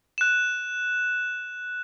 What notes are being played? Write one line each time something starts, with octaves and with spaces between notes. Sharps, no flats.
F#6 E7